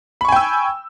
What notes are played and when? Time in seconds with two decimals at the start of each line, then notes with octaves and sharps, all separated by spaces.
0.21 B5
0.25 C#6
0.29 G#5
0.32 G5
0.36 E6